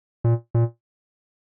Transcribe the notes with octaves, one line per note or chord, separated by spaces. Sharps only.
A#2
A#2